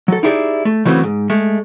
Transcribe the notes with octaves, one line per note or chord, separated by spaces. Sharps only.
F#3 A4
D#4 E4 G4 G#4 D5
A3
C#3 E3 F#3 A3 B3 C4
G#2
G#3 A3